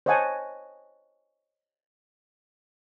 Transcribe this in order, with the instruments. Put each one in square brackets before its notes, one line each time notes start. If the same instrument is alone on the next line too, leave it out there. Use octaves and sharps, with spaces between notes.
[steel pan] C5 C#5 D#5 F#5 G#5 A5